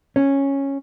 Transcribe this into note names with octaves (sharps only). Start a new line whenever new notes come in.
C#4